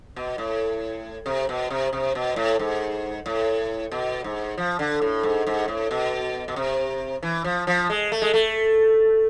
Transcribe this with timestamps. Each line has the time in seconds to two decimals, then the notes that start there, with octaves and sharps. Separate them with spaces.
0.16 B2
0.38 A2
1.26 C3
1.49 B2
1.70 C3
1.93 C3
2.15 B2
2.36 A2
2.59 G#2
3.26 A2
3.91 B2
4.24 G#2
4.57 F3
4.79 D3
5.02 A2
5.23 G#2
5.47 G#2
5.68 A2
5.91 B2
6.48 B2
6.56 C3
7.23 E3
7.44 F3
7.67 F3
7.90 G#3
8.12 A3
8.22 G#3
8.34 A3